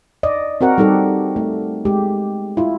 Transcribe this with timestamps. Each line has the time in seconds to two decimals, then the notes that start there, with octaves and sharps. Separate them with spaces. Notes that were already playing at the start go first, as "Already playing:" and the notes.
0.23 D5 D#5
0.61 C4 F#4 A#4 F#5
0.78 G3 D#4 G4 A4
1.36 A3
1.85 G#3 G4
2.57 E4 F4